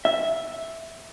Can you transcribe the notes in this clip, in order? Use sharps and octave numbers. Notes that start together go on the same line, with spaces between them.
E5